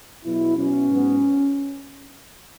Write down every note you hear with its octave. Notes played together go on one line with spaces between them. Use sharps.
E2 B2 F#3 E4
B2 F#3 B3 C#4
G#2 F#3 B3